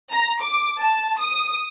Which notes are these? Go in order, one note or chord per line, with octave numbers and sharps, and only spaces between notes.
A#5
D6
A5
D#6